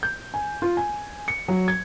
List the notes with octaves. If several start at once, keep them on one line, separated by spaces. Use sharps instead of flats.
G6
G#5
F4
G#5
C#7
F#3
G#6